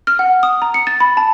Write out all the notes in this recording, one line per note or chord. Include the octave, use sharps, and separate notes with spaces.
F6
F#5
D#6
A#5
C#7
A6
B5
A5